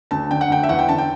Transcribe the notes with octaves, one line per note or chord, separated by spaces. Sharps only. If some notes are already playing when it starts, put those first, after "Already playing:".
D2 A5
D3 G5
F#5
D2 G5
E5
E2 F#5
G5
D3 A5
G5